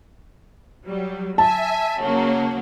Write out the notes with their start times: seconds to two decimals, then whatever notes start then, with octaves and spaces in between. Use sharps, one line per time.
0.86 F#3 G3
1.38 E5 G#5 A5
2.00 C#3 F#3 A#3